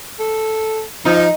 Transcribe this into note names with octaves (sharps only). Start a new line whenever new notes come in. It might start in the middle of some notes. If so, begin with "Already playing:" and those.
A4
F3 D#4